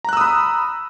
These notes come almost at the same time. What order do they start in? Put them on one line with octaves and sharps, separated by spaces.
A#5 F#6 E6 D#6 B5